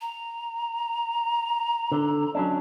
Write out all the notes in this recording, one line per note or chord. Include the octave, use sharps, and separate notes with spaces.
A#5
D3
F#3 C#4 D4